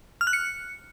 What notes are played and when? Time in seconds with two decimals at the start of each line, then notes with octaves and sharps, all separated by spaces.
0.21 F6
0.27 F#6
0.33 C#7